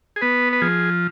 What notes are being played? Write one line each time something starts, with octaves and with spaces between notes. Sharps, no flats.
G#4
B3 B4
B4
F3 G#4